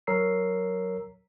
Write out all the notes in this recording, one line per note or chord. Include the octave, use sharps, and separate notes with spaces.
F#3 A#4 C#5 A#5 E6 C7